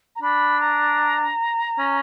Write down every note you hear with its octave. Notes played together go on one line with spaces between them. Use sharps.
A#5
D4 B5
A#5
C#4